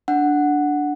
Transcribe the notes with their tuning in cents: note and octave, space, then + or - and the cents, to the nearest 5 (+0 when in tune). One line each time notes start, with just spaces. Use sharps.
D4 +0 F#5 +0